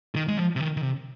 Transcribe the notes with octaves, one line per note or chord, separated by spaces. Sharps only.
D#3
G#3
F3
C3
D#3
D#3
C3